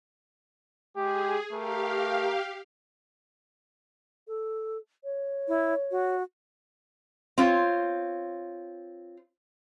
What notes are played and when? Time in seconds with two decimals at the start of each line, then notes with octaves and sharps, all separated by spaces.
0.97 G#3 G4 G#4
1.53 A3 G4 A#4 F5
4.28 A4
5.04 C#5
5.48 E4
5.91 F#4
7.38 C4 F4 C#5